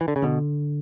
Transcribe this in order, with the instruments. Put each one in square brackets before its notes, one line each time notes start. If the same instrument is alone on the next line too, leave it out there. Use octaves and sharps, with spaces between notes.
[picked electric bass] E3
D3
C#3
[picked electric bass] B2 [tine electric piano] D3